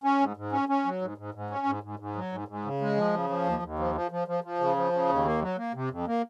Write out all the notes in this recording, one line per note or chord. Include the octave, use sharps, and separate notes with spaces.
C#4
G#2
G#2
C#4
C#4
F#3
G#2
G#2
G#2
C#4
G#2
G#2
G#2
F#3
G#2
G#2
C#3
G#3
F3
C#3
F3
D#2
D#2
F3
F3
F3
F3
F3
C#3
F3
C#3
D#2
A#3
F#3
A#3
C3
F2
A#3